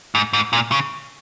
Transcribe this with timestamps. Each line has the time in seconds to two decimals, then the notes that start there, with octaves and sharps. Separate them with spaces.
0.15 G#2
0.33 G#2
0.53 A#2
0.72 C#3